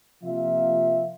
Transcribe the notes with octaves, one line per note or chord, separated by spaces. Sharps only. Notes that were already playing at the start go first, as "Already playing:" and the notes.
C3 F3 A#3 F4 E5